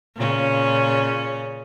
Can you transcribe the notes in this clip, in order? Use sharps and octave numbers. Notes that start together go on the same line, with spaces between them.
A#2 C#3 C#4